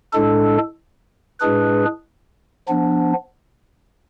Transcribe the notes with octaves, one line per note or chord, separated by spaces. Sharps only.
A2 G#3 D4 A4
A2 G#3 D4 G#4 B4
F3 B3 D4